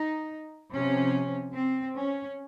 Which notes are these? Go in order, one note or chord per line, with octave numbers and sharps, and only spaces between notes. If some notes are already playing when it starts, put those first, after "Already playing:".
Already playing: D#4
C3 F3 C#4
C4
C#4